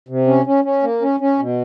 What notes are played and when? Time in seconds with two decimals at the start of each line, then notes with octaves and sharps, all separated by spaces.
0.09 C3
0.27 C#4
0.46 C#4
0.64 C#4
0.83 A#3
1.02 C#4
1.20 C#4
1.39 B2